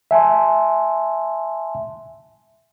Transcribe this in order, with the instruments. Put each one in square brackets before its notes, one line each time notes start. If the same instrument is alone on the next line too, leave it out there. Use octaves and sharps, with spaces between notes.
[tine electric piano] E5 G#5 A5 C6